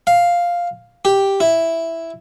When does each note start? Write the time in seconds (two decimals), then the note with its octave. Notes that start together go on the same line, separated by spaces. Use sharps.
0.07 F5
1.05 G4
1.40 E4